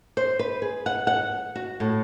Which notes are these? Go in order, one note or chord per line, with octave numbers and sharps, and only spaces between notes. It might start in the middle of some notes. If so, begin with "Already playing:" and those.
C5
B4
G#4
F#5
F#5
F#4
A2